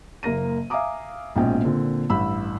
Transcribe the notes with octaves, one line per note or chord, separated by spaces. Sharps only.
F#1 A#3 A#6 D#7
E5 F5 G#5 A#5 D6 D#6
A#1 G#2 B2 C#4 G5
A#2 D3 C4
A1 G2 B5 E6